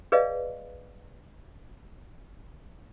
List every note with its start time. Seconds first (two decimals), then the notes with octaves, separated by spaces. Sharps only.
0.12 G#4 B4 D5 D#5 F5